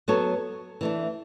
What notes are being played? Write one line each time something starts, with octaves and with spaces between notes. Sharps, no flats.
F#3 B3 F#4 A4 C#5
E3 A3 D4